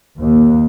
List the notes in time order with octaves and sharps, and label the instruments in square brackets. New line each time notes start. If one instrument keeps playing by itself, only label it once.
[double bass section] D#2